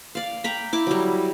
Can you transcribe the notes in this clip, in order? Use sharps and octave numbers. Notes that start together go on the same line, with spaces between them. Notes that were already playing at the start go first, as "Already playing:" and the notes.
D5 F5
G5 A#5 B5
E4 D6
F#3 G3